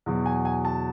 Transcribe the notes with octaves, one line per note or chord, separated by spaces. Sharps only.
E2 B2 F#3
G#5
G#5
A5